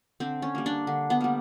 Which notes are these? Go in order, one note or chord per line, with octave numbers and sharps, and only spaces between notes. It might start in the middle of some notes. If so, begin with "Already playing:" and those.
D3 C4
C#4
G3 A#3
D4
D3
B3
G3 A#3